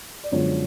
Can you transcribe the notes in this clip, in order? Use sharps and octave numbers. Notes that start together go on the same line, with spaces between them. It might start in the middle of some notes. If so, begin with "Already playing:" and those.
D5
F#2 D3 F3 G#3 B3 C#5